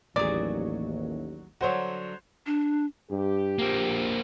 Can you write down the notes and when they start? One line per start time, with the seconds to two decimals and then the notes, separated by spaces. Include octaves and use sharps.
0.16 A1 D#2 F#3 G#4 D5
1.61 D3 F#3 F#4 C5 C#5
2.46 D4
3.11 G2 G4
3.59 A#1 A#3 C4